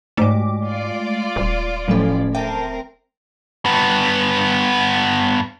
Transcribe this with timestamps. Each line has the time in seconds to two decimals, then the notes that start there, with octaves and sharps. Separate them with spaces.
0.17 G#2 G#3 A3 D6
0.66 F4 D5
1.36 D#1
1.88 A2 F3 F#3 A3 C#4 A4
2.35 C4 A#4 E5 G5 A5
3.66 G2 B3